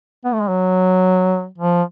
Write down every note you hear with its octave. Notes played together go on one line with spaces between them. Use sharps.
B3
A3
G#3
F#3
F3